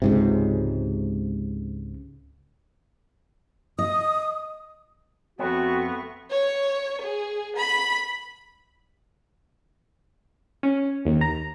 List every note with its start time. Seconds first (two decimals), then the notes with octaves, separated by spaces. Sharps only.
0.02 C#2 G#2 C3
3.79 D#5 D#6
5.39 F2 A3 B3 C4 F#4 C#6
6.30 C#5
7.02 G#4
7.57 B5
10.63 C#4
11.05 D#2
11.21 A#5